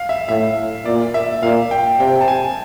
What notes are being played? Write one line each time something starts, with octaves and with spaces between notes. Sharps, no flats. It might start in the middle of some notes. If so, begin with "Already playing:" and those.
Already playing: F5
E5
A2 E5
A#2 D5
E5
A#2 F5
G5
C3 G5
A5
G#5